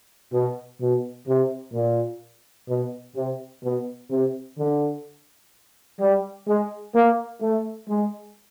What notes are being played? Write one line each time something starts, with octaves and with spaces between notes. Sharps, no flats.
B2
B2
C3
A#2
B2
C3
B2
C3
D3
G3
G#3
A#3
A3
G#3